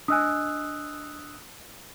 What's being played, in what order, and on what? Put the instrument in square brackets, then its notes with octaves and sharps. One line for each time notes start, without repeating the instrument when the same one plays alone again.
[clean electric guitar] D4 D#5 G#5 [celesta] D#6 E6 F#6